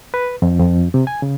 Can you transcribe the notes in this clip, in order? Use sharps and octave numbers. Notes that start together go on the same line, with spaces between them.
B4
F2
F2
C3
G#5
C#3